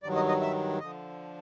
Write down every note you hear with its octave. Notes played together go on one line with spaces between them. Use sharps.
G2 D#3 F#3 D5
D#5
D#5
E5
D3 F3 D#5